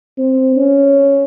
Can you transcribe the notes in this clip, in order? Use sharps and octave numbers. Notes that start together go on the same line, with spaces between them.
C4
C#4